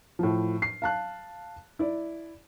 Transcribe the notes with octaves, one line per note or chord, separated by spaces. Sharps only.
A2 F3
C7
F5 A5 F#6
E4 D5